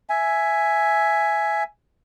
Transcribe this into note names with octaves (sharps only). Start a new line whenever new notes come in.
E5 G#5